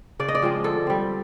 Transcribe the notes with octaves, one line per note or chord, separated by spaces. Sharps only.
C#3 D5
D#5
D5
F3 G#3 C4
D3 A4
G3 C4